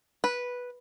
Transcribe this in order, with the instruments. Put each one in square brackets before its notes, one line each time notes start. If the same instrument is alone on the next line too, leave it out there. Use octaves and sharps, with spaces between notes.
[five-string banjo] B4